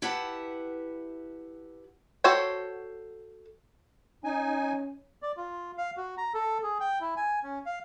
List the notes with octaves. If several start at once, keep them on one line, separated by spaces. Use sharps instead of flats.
E4 G4 B4 E5 F#5 A5
F#4 A4 C5 C#5 G5
C#4 D#4 G#5
D5
F4
F5
F#4
A#5
A4
G#4
G5
E4
G#5
C#4
F5